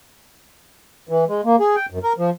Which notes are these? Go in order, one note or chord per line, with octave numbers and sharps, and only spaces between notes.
E3
G#3
A#3
G#4
G5
F#2
A#4
F3